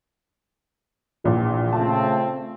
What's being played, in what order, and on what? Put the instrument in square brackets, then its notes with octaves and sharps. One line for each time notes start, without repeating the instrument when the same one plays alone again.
[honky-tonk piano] A#1 A#2 E3
[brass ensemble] C#3 A3 C4 [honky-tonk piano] F4 A5